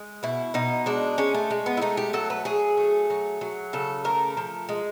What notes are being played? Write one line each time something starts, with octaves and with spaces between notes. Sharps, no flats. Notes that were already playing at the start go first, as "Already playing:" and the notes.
Already playing: G#3
B2 E4
B2 D#4
G#3 D4
G#3 C#4
A3
G#3
B3
E4
A3 D#4
G4
F#3 A4
B4
F#3 G#4
A3
F#3
F#3
C#3 A4
A3 A#4
F3
G#3